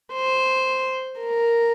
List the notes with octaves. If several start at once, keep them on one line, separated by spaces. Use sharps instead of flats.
C5
A#4